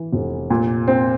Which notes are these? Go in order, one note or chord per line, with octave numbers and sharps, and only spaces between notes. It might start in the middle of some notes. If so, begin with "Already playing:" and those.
Already playing: E3
F1
A#2
C4